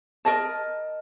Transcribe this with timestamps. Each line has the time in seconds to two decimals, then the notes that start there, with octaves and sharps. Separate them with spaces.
0.25 A#4 D#5 A5